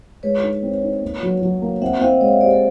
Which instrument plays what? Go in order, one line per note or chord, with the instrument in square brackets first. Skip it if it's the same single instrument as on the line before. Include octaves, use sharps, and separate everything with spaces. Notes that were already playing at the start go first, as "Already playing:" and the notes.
[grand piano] G#3 [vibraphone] B4 C#5
[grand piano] D#4
C4
D#4
A#3
F#3
F#3
A#3
[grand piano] C4 [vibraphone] E5 F#5
[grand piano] C4 [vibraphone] D#5 F5
[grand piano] G#3 [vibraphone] C#5 D#5
[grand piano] G4 [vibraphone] C5 D5
[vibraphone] A4